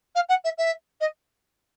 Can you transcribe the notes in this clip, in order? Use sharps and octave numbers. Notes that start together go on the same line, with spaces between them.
F5
F#5
E5
E5
D#5